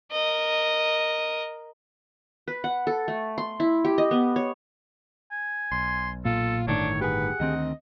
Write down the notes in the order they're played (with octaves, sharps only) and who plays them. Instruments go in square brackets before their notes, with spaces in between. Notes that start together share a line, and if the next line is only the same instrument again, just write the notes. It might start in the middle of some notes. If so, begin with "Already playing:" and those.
[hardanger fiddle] A#4 D#5
[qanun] B4
F#5
A4
A3
C6
E4
G4
D#5
B3
C#5
[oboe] G#5
[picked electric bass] B1 [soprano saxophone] C6
[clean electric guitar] A#2 [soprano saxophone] F4 [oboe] A4
[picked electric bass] G1 A2 D#3 [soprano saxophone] D4 [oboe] C#5
[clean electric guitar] G4 G#4 [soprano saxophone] B4 [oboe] F#5
[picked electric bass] D2 D#3 C4 [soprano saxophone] D#5